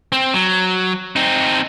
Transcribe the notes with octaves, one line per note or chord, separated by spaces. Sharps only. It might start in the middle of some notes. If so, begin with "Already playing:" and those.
C4
F#3
C4 D#4